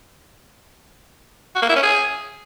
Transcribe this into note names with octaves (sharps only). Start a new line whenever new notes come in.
F#4
A#3
E4
C#4
G#4